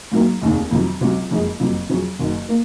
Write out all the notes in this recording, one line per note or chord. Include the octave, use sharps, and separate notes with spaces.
G#2 F#3 A#3
F1 D#2 C#3
F2 C3 D#3 F#3
C#2 C3 F#3 C#4
F#1 F2 C#3 F3 G#3
F#1 F2 C3 F#3
F2 C#3 F#3 C#4
F#1 F#2 D#3
A#3